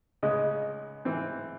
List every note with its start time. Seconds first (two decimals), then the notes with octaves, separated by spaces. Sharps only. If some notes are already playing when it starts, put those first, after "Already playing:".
0.23 C#2 C#3 G#3 D#5
1.05 G#2 E3 C4